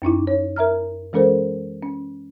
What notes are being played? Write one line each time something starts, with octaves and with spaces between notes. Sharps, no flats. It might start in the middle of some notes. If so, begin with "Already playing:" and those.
F#2 C#4 D#4 E4
C#5
A#4 E5 A#5 F6
E3 G#3 C#4 A4 A#4 C5
C#4